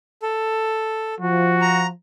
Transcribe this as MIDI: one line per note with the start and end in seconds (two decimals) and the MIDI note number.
0.22 1.14 69
1.20 1.90 53
1.20 1.86 66
1.61 1.87 82